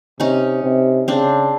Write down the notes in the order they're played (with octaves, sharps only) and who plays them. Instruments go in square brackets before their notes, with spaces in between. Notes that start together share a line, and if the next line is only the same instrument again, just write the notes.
[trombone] C3 [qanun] C#4 D#4
[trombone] C3
[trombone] C#3 [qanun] C4 D4